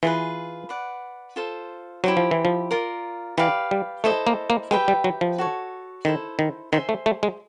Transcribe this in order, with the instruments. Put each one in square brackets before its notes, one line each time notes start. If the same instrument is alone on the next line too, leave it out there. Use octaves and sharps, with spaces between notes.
[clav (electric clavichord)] E3 [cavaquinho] F4 G#4 B4
[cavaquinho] B4 D5 F#5
F4 A4 C5
[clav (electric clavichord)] F#3 [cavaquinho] E4 G4 C5
[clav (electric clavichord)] F3
E3
F3
[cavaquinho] F4 A#4 D5
[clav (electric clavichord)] E3 [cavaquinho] G4 B4 D5 F5
[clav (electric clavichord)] G3
[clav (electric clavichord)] A3 [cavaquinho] E4 A4 C5 D#5
[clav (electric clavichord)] A#3
A#3
[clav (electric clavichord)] G#3 [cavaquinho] G4 B4 E5 G5
[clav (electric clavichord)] G3
F#3
F3
[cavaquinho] F#4 A4 C#5
[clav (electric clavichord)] D#3 [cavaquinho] E4 A4 C5
[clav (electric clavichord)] D#3
[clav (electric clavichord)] D#3 [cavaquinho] C5 E5 G#5 C6
[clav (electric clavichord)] A3
A3
G#3